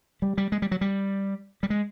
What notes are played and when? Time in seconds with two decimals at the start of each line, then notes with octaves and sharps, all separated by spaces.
0.22 G3
0.38 G3
0.52 G#3
0.62 G3
0.71 F#3
0.81 G3
1.63 G3
1.70 G#3